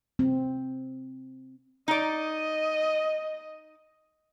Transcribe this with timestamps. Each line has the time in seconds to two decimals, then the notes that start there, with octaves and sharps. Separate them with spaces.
0.19 C4
1.88 D#4 D5 D#5